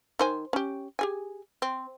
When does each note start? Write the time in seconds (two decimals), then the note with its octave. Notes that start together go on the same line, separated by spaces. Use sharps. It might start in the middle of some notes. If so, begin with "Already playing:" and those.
0.19 D#3 C5 G#5
0.53 C#4 G4
0.99 G4 G#4 G#5
1.62 C4